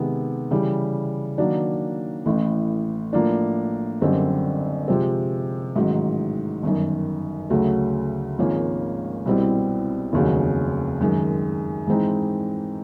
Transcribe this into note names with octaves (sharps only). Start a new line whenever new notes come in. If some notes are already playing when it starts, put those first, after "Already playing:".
Already playing: C3 D#3 G#3 B3
C#3 E3 G3
D#3 F#3 A#3 D4
A1 A2 E3
A2 F3 A#3 D4
F#1 F#2 D3 G3 C4
C3 F3 G#3 C4
A1 G#2 D#3 F#3
G1 F#2 D#3
D2 C#3 F#3 A3
G#1 G#2 F3 A#3 C#4
C2 B2 G3 C4 E4
F1 D#2 C#3 F#3
F#2 D#3 G#3
G#2 E3 G#3 C4 D#4